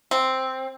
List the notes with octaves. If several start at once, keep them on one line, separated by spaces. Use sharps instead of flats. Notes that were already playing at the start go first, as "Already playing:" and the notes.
C4